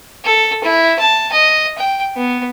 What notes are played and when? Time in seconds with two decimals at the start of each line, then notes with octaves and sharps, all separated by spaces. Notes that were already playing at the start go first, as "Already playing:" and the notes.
0.24 A4
0.64 E4
0.99 A5
1.32 D#5
1.78 G5
2.17 B3